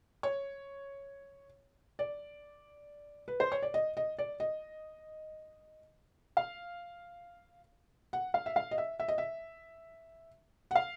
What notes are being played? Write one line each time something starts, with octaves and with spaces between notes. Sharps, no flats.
C#5
D5
B4
C5
C#5
D5
D#5
D#5
D5
D#5
F5
F#5
F5
E5
F5
D#5
E5
E5
D#5
E5
F#5
F5